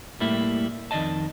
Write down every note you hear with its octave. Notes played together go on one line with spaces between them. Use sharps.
A2 G3 A3 A#3 E4
F2 D#3 A4 D5 D#5 A5